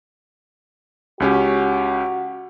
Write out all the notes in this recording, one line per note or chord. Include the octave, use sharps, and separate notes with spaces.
C#2 C#4 F#4 G4